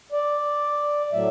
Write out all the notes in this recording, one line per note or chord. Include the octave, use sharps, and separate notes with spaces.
D5
A2 F#3 A3 E5